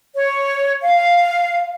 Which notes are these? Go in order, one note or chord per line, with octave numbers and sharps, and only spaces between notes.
C#5
F5